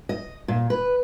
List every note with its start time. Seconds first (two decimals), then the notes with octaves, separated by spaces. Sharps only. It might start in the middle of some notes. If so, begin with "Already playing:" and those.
0.09 D#5
0.48 A#2
0.70 B4